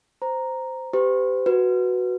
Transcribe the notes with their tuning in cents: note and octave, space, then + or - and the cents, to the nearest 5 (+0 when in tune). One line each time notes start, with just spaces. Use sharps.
C5 -10 A#5 +0
G4 +0 C5 -45
F#4 +0 B4 -5